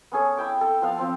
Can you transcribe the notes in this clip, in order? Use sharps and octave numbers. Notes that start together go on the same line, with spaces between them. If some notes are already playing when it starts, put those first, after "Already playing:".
B3 C#4 G#4 A4
E4 E5 G5 D6
A4 E6
F3 B3 F5 A5
F3 C4